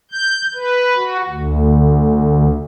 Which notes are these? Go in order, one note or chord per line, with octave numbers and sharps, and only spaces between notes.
G6
B4
F#4
D2